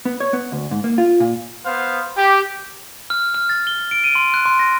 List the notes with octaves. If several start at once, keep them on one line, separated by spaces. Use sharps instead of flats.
B3
C#5
B3
D2
G#2
A#3
F4
A#2
B3 C5 F5
G4
F6
F6
A6
G7
D7
D#7
C6
F#6
C6
A#6